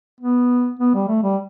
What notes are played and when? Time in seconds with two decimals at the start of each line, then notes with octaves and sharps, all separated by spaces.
0.21 B3
0.79 B3
0.95 G3
1.08 A3
1.23 G3